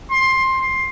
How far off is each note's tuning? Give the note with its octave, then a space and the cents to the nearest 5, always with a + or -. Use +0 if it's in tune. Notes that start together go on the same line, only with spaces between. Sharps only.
C6 +15